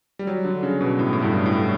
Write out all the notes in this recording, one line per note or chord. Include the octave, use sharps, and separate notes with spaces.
G3
F#3
D3
C#3
B2
A2
A2
G2
A2